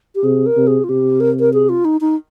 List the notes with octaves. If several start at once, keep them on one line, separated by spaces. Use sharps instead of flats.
G4
C3 G#4
A#4
C3
G#4
F4
C3 G4
A#4
A#4
G#4
F4
D#4
D#4